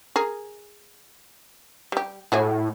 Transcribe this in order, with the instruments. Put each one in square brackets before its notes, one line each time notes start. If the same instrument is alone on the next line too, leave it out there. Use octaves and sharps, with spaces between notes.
[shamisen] G#4 A#4
G3 G4
[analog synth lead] A2 [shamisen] A3 F#4 G#4